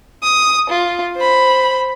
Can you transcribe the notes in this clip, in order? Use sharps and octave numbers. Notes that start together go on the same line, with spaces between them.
D#6
F4
C5 B5